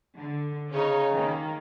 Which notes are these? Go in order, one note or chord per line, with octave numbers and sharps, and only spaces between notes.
D3
C#3 C#4 D#4 C#5
D#3 A#3